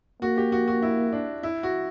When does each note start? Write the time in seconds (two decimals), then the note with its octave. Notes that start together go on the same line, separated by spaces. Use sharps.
0.22 A#3 F#4
0.37 G4
0.52 F#4
0.68 F#4
0.82 E4
1.13 D4
1.43 E4
1.63 F#4